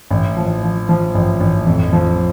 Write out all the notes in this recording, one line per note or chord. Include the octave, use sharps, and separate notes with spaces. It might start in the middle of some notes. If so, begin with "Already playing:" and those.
A1
F3
F3
F3
A1
A1
F2
F3